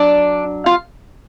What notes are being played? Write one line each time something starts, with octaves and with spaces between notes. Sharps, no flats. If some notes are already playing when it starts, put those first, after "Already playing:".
Already playing: F#3 D4 D5
F4 F5